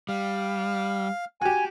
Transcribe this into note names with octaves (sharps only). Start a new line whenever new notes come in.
G3 F5
F#4 G4 G#5